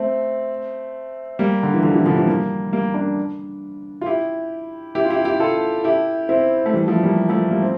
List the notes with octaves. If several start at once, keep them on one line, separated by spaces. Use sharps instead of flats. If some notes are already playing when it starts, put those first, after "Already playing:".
Already playing: A3 C4
G3 A#3
D3
E3
D3 F3
C3 E3
D3 F3
E3 G3
G3 A#3
G3 A#3
A#3 D4
F4
E4 G4
E4 G4
F4
E4 G4
E4 G4
F4 A4
E4 G4
C4 E4
A3
E3 G3
F3 A3
G3 A#3
F3 A3
G3 A#3
C4